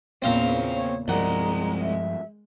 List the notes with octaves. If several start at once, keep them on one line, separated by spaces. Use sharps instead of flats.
E2 A#2 C#3 C4 F5 A#5
C#5
C2 G2 F3 G#3 F#5 A#5
E5